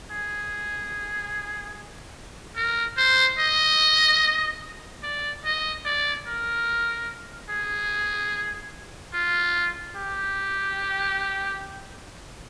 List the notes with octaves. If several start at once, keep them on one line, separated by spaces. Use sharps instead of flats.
G#4
A#4
C5
D#5
D5
D#5
D5
A#4
G#4
F4
G4